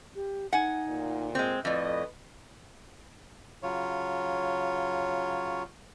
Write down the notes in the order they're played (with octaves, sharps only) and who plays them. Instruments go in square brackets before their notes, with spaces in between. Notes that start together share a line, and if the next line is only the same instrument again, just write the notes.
[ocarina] G4
[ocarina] D#4 [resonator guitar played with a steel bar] F#5 G#5
[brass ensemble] D2 A#2
[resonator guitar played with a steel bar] G#3 C4
[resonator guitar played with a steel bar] F2 A2 [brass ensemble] B4 D#5 [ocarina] D5
[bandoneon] C#3 F#3 F4 C#5